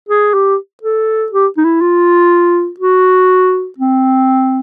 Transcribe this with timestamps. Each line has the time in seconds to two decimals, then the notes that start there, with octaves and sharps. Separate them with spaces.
0.09 G#4
0.34 G4
0.83 A4
1.32 G4
1.57 D#4
1.64 E4
1.81 F4
2.80 F#4
3.78 C4